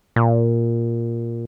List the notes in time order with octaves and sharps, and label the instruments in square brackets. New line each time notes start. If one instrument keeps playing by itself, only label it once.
[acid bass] A#2